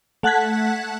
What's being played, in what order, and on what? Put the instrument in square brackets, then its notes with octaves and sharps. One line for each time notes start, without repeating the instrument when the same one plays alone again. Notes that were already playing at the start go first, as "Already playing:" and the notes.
[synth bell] A3 F#5 A5 F#6 G#6 B6